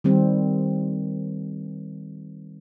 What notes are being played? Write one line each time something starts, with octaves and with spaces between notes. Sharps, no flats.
D#3 G3 C4